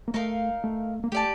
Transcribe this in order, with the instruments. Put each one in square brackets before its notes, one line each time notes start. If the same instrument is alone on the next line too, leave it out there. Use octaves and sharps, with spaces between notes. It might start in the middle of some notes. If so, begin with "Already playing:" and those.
[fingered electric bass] A#3
[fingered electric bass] A3 [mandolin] D#4 A#4 F5
[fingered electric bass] A3
A#3
[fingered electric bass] A3 [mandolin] G4 D5 A5